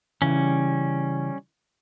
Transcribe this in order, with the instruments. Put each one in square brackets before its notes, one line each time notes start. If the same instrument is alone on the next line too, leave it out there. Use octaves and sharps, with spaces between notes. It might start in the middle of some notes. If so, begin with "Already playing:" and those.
[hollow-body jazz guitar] C#3 E3 [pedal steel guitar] G3 C#4